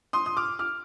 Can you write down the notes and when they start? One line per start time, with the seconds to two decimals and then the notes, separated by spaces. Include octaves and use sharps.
0.13 C6 D#6
0.26 D#6
0.37 D6 F6
0.59 D6 F6